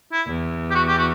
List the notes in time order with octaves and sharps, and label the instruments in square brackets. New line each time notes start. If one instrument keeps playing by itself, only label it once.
[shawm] E4
[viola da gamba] E2
[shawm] G4
F#4
G4
F#4